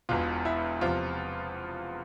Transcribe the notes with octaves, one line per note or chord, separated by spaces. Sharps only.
E1 E2 B2 F4
E4
E2 C3 F3 F4